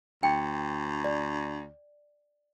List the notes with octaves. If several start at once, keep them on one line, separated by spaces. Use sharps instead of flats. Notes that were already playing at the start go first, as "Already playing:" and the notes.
D2 G5
D5